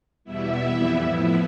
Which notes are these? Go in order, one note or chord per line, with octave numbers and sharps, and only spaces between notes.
E2 B2 G3 B3 E4 E5
F2 E3 G3 B3
A2 F3 B3